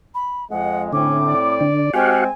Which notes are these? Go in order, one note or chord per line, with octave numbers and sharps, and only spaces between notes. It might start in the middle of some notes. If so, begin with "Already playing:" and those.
B5
F2 G#3 F#5
A2 D3 C4 C#4 D6
D5
D3 D4
G#3 C4 F#4 G4 F5 F#5 G#5